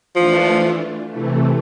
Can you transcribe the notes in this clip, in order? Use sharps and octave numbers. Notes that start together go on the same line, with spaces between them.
E3 F3 A3 D4 F4
C3 E3 A3